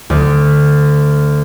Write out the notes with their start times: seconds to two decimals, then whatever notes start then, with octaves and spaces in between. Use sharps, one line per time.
0.10 D2